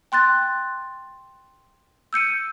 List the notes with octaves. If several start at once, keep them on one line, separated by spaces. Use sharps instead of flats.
G5 C6 F#6 A6
E6 G6 C#7 D#7